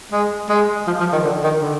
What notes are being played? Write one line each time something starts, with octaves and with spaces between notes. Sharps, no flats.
G#3
G#3
F3
F3
D#3
D3
D#3
D3